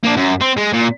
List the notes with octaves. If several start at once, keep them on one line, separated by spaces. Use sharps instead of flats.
A#3 D4
F#2
C4
G#3
A#2